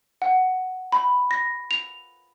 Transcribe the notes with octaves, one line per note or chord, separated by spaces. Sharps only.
F#5
B5
A#6
F7